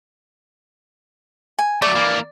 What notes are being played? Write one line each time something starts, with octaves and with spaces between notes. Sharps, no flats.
G#5
F#3 A3 D5
E3 A#3